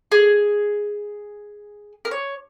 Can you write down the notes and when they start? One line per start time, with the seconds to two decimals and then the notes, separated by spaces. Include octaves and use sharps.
0.12 G#4
2.05 A#4
2.11 C#5